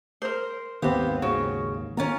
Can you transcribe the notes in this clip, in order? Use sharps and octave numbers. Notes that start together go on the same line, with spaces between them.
A#4 C5
G#1 D#2 D#3 B3 C4 G4 F5
C#3 F#4
D#3 A#3 C#4 F4 A#5